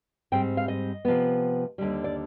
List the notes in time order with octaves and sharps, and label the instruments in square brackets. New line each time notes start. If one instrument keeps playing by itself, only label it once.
[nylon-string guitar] G#2 G3 C4 G5
F5
D#5
C3 F3 B3
D#2 D3 G3
D5